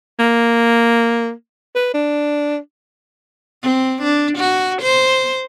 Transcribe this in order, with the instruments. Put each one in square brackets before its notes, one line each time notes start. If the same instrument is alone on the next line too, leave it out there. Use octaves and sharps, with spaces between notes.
[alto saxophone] A#3
B4
D4
[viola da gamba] C4
D4
F#4
C5